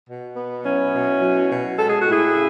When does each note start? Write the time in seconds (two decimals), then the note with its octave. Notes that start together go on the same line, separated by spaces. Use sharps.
0.09 B2
0.36 B3
0.64 F#3 C#4 E4
0.93 B2
1.21 F#3
1.49 B2
1.77 G#3 A4
1.88 G#4
2.00 F#4
2.05 A2 E4 G#4
2.34 C#3